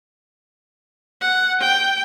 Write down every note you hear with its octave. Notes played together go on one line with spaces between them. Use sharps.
F#5
G5